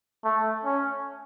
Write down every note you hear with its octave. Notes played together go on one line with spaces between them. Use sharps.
A3
C#4